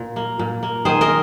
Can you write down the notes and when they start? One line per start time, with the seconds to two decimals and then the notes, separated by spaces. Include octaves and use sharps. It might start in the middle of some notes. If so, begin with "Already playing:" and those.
Already playing: A#2
0.16 A#3
0.39 A#2
0.63 A#3
0.85 D#3 G#4 C5
1.01 A#4 D#5